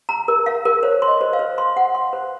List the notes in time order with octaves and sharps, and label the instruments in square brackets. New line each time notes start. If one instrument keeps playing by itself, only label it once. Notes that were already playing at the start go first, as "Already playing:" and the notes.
[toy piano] A#5
A#4
F5
A#4
[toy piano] C5 [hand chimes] C#5
[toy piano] C6
[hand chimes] D#5
[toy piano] C5
[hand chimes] F5
[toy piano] C5
C6
F#5
C6
C5